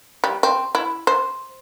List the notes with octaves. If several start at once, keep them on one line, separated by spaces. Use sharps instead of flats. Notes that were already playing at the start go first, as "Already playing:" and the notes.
G3
C4
E4
C5